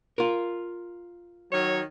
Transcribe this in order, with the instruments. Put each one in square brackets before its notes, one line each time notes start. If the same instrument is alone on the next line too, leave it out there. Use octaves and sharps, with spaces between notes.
[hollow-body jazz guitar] F4 A#4
[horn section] D#3 F#3 C#5